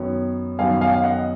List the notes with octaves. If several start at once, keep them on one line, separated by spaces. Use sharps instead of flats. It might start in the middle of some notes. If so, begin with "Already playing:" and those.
Already playing: F#2 D#3 F#3 B3 C#5
F#2 D#3 F#3 B3 F5 G#5
F5 G#5
F5
D#5 F#5